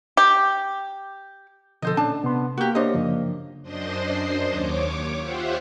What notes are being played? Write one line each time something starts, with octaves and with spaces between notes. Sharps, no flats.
G4
B2 D3 F3 A4 C5 D#5
A#2 C#4 D4 A5
C3 B3 C6
A#3 F#4 G4
D4 G4 C5 C#5 D#5
F#2 C#3 F3
F#2 D4 C5 D#5 C6
D#2 C#5 D6
F4 G4 C5 E5 F#5